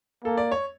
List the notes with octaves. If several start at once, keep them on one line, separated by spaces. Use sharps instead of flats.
A#3 A4
D5
C#5